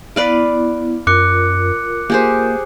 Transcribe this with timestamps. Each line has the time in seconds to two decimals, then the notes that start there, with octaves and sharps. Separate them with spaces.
0.16 B3 E4 B4 D5 F5
1.07 F#2 F4 A#4 D6 F#6 C#7
2.10 A#3 G4 G#4 C5